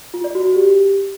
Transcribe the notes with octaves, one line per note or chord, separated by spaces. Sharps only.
F4
D5
F#4
F#4
G4